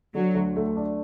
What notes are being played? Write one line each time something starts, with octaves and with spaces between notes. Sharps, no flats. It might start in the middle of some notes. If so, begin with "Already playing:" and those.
D3 F#3
D2
A3
D4